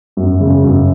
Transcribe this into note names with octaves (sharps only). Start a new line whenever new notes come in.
F#2
C#3
F#2